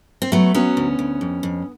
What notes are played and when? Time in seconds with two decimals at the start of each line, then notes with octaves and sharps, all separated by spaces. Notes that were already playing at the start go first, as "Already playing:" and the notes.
0.22 C4
0.32 F#3 A3 B3
0.54 F#3 B3 C#4
0.77 D2
0.99 D2
1.21 F2
1.43 F2